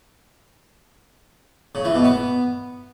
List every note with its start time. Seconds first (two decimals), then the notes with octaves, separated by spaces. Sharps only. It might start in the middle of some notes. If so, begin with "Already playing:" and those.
1.75 C#3
1.85 E3
1.95 B2
2.05 B3